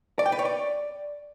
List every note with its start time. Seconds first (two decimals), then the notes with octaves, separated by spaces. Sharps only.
0.19 D5
0.26 G5
0.32 B4
0.39 C#5
0.45 D5